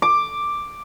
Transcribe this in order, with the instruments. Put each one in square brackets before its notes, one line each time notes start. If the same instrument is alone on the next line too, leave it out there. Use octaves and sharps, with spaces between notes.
[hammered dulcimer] D6